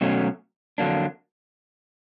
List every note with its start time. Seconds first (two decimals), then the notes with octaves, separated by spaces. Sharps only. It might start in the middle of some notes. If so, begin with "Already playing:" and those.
0.01 B2 F#3 A3 C#4
0.78 F2 D3 F#3 A#3 D4